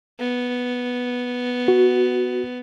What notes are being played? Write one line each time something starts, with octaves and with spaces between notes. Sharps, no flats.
B3
F#4